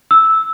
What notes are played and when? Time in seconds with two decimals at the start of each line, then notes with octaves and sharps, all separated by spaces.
0.11 E6